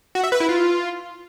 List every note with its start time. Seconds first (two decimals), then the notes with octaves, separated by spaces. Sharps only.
0.15 F#4
0.24 E5
0.32 B4
0.40 E4
0.49 F4